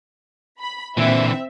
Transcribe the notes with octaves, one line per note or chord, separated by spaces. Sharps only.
B5
A#2 D3 E3 C4 E5